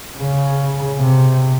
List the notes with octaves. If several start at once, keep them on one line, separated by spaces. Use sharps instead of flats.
C#3
C3